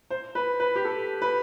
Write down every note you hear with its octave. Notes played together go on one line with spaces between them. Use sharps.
C5
B4
B4
G4
A4
B4